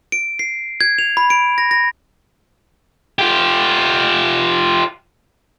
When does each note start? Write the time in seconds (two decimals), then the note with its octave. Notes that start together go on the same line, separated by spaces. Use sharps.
0.12 D7
0.39 C7
0.81 G#6
0.98 F7
1.17 B5
1.30 D7
1.58 A#6
1.71 A#6
3.19 F4 G4